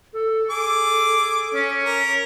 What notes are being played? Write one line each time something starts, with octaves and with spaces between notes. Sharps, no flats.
A4
G#4 D6
C#4
A#4